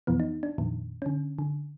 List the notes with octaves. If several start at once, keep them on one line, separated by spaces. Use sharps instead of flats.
F2 B2 E3 B3
D#4
D4
F2 A#2 D#3
D3 C#4
D3